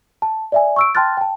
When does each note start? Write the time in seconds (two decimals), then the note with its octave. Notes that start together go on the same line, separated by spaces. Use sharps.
0.22 A5
0.52 D5 E5 G#5
0.76 C#6 E6 D7
0.95 G5 A5 C6 F6 F#6 A6
1.17 G5 A5